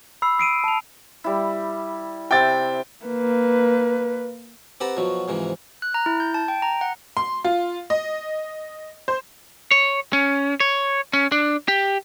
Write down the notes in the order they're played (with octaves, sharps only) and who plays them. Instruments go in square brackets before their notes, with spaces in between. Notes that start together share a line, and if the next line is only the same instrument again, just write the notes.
[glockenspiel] B5 E6 C7
D#6 C7 D7 D#7
A5 F7
[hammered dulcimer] G3 E4
[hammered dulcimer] C3 E5 C6 [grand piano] G5 A6
[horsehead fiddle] A#3 B4
[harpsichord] C4 G4 B4 F#5 A5 A#5
B2 F3 F#3
G#2 C3 E3 F3
[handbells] F#6
A#5
E4
G6
A5
G5
A#5
F#5
[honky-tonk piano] C6
F4
D#5
C5
[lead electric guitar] C#5
C#4
C#5
C#4
D4
G4